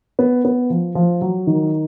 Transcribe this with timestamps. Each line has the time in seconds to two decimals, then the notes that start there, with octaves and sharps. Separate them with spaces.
0.19 B3
0.45 B3
0.70 F3
0.95 F3
1.22 F#3
1.47 D#3